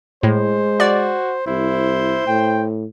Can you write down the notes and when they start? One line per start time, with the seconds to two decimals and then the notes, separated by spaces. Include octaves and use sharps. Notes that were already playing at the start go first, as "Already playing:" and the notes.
0.23 A2 G#3 C5
0.80 F#4 D5
1.47 C2 E4 C5
2.27 A2 G5